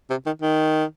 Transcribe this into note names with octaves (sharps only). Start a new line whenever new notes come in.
C3
D#3
D#3